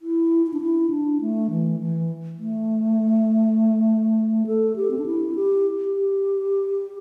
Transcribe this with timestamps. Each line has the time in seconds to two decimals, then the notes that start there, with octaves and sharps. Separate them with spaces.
0.02 E4
0.46 E4
0.53 D4
0.61 E4
0.90 D4
1.21 A3
1.50 E3
1.80 E3
2.39 A3
4.47 A4
4.76 G4
4.91 C4
4.98 D4
5.06 E4
5.35 G4
5.94 G4